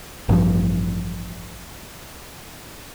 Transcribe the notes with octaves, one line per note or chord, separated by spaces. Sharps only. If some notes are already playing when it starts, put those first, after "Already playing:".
A1 G2 F3